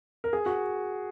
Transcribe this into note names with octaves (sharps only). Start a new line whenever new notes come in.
A#4
G#4
F#4